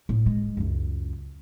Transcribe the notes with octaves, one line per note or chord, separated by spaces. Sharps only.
A2
G#3
C#2 F#2